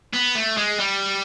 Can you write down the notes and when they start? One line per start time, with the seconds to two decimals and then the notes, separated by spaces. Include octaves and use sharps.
0.14 B3
0.35 A3
0.57 G#3
0.79 G3